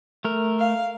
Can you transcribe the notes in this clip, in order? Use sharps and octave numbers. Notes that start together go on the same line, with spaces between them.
A3 A#4
F5